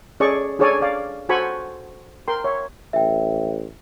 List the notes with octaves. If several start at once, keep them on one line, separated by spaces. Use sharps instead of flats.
C#4 G#4 A4 D5 D#5 C#6
D4 G#4 A4 C#5 D5 G#5
D5 F5
F#4 A4 C5 G#5 B5 C#6
A#4 G5 C6
C#5 E5
A1 E5 G5